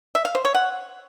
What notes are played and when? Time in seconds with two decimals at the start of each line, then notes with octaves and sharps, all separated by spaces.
0.15 E5
0.25 F5
0.35 C5
0.45 C#5
0.55 F#5